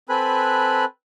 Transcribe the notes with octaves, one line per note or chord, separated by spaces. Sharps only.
C4 A4 B4 G#5 B5 F#6